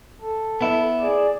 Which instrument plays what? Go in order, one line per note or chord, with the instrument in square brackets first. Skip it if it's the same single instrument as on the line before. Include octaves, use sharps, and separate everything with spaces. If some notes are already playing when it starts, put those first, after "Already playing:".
[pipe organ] A4
[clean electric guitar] B3 E4
[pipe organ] G#4 D5